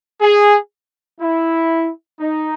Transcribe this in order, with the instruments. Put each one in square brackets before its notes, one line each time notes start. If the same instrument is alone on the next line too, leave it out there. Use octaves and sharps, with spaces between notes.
[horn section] G#4
E4
D#4